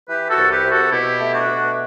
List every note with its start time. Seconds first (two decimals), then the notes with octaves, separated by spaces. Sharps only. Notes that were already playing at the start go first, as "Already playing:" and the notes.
0.09 E3 G4 B4
0.29 F#4 A4
0.37 C2
0.50 G4 B4
0.64 C3
0.70 F#4 A4
0.91 B2 E4 G4
1.20 A3
1.32 D4 F#4
1.47 B2